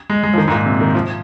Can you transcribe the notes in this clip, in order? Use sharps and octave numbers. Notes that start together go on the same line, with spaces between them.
G#3
G#3
F3
D#3
G#2
A#2
C3
D#3
F3